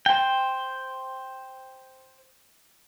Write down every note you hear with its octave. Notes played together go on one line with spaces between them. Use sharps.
C5 G5